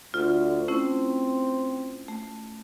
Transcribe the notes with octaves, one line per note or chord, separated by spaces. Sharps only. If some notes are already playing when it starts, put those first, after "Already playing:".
D2 F4
A3 C4 C#4 E4
A3